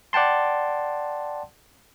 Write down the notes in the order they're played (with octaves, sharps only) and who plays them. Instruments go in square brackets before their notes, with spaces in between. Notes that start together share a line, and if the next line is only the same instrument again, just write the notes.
[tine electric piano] D5 F#5 G5 A5 C6